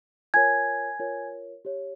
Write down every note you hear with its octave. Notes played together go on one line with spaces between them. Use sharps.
F4 A#4 C#5 G#5 G#6
F4 A#4 C#5
G4 C#5